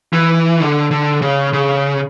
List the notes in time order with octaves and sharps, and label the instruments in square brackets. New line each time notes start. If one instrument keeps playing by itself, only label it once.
[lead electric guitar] E3
D3
D3
C#3
C#3